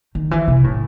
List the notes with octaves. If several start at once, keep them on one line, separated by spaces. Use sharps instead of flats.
D#3
E3
C3
A2